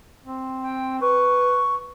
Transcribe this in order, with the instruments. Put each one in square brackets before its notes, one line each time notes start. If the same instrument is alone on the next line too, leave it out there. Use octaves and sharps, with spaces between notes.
[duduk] C4
[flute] G5
[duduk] B4 [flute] C#6